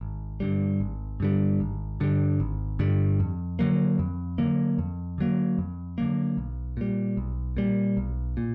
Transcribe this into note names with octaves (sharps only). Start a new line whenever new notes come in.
G#1
G2 D3 G3
G#1
G2 D3 G3
G#1
G2 D3 G3
G#1
G2 D3 G3
F2
D3 F#3 A#3
F2
D3 F#3 A#3
F2
D3 F#3 A#3
F2
D3 F#3 A#3
B1
A#2 G3
B1
A#2 G3
B1
A#2